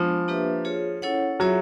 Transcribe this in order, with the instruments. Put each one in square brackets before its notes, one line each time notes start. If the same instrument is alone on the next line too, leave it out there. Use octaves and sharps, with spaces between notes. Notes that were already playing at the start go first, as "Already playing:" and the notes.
Already playing: [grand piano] F3 [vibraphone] G#3 B3 D4
[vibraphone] A#3 D4 G4 B4 E5
F4 G#4 C#5
C#4 E4 A4 C#5 F#5
[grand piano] F#3 [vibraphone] F4 G#4 C#5 E5